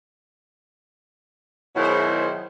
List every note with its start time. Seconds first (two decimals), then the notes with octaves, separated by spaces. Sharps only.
1.76 B2 D#3 F#3 E4 G#4 C5